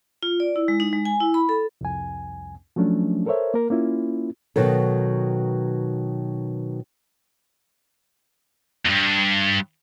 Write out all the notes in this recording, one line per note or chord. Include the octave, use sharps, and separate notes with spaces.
F4
D5
E4
G#3
D#4
G#3
G#5
E4
B5
A4
C2 F2 G#5
F3 F#3 A3 C#4 D4
A4 A#4 C5 C#5 E5
A#3 A#4
A#3 C#4 E4 F4
B2 D#3 F#3 A4
E2 G2